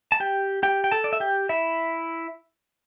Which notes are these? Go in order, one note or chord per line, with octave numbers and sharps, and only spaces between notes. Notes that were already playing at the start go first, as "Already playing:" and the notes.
A5
G4 G5
G4 G5
G5
A4 A5
D5
E5
G4 G5
E4 E5